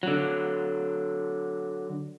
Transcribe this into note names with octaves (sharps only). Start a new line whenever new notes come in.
D3 F#3